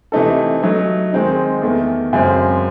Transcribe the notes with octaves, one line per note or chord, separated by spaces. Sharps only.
C3 E3 A3 D#4 A4
F#3 A3 D#4
D#3 G#3 C4 D#4
E2 D#3 A3
F#2 C#3 G#3 C4